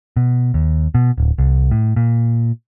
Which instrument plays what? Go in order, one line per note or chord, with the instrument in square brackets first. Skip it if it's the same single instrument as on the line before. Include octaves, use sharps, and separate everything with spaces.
[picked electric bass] B2
D#2
B2
D1
C2
A2
A#2